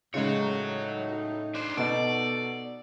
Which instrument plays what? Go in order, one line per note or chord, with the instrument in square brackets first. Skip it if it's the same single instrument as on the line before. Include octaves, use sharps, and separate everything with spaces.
[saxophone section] A2 D#4 [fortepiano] C#3 G#3 [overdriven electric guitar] F#4 C#5
[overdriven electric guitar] D4 C5
[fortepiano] B2 D#4 [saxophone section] F#4 A4 [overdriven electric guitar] D5